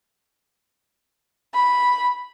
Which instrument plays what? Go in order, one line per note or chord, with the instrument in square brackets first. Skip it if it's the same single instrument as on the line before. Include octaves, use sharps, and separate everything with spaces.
[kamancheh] B5